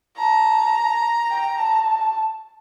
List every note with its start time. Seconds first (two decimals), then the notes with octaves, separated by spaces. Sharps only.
0.17 A5 A#5
1.30 G5
1.58 A5